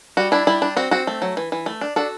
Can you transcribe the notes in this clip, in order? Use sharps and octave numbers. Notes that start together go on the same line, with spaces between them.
G3 F#4
D4 E4
G3 E4
D4
C4 F#4
C4 F#4
A3
F#3
E3
E3
A3
D4
D4 F#4 A4